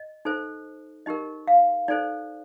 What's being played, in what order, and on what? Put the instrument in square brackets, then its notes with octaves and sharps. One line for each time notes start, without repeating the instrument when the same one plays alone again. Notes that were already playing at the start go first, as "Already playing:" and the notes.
Already playing: [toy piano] D#5
D#4 A4 C5
D#4 G4 A#4 D#5
F5
D#4 A4 C5 D5